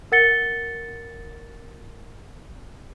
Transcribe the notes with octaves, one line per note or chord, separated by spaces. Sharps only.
A#4 F#5 A6 C#7 G7